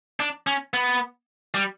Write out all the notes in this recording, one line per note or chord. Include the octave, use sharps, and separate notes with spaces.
D4
C#4
B3
G3